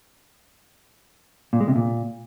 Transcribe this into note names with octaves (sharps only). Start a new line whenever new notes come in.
A#2
G#3
C3
A#2